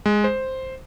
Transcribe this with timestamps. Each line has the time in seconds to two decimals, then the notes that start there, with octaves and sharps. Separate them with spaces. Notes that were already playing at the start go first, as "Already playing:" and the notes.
0.06 G#3
0.24 C5